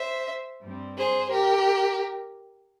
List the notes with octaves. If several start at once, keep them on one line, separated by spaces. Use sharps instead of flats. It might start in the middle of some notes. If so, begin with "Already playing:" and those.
Already playing: C5 E5
G2 G3 C4
G#4 C5
G4 A#4